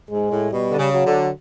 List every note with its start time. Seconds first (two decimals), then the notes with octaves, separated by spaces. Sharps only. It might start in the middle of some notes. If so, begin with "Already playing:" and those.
0.10 G#2 G#3
0.31 A2
0.51 B2 G3
0.71 D3
0.78 C#3
0.92 F#3
1.06 D3